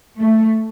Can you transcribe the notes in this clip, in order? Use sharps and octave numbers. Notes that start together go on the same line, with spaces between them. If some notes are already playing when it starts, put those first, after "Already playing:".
A3